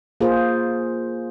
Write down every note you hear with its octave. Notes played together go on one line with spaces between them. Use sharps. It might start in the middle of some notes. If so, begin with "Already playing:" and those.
A#3 F4 G#4 C5